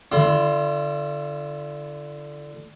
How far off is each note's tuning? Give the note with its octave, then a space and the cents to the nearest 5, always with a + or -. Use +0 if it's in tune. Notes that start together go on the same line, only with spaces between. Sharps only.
D3 +0 F4 -45 C6 +20